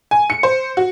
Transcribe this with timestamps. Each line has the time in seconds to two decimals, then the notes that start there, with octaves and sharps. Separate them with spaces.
0.11 G#5
0.30 C#7
0.43 C5
0.77 F#4